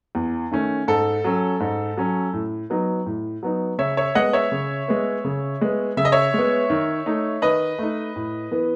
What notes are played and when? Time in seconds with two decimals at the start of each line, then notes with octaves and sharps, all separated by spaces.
0.15 E2
0.52 D#3 A3 C#4
0.88 G#2 A4
1.24 F#3 C#4
1.60 G#2
1.97 F#3 C#4
2.33 A2
2.70 F#3 B3 D#4
3.06 A2
3.43 F#3 B3 D#4
3.78 C#3 C#5 E5
3.97 C#5 E5
4.15 G#3 B3 D#5 F#5
4.33 C#5 E5
4.52 C#3
4.88 G#3 B3
5.25 C#3
5.61 G#3 B3
5.97 C#3 E5
6.05 D#5
6.12 C#5 E5
6.34 G#3 B3
6.70 D#3
7.06 A3 D#4
7.42 D#3 B4 D#5
7.79 A3 D#4
8.16 A2
8.51 E3 B3